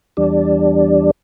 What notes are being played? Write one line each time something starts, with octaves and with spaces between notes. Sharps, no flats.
E2 G3 D4